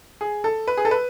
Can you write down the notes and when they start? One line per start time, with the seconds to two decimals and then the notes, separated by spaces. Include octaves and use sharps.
0.21 G#4
0.44 A4
0.68 B4
0.77 G#4
0.85 A4
0.91 B4